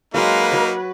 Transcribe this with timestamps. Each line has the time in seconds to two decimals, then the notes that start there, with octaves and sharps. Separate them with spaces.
0.14 F#3 G#3 A#3 D#4 B4 F5
0.52 F#3 C#5